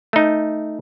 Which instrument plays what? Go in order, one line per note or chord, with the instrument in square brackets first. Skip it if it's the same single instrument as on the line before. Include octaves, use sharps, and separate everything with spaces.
[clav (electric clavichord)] A3 D#4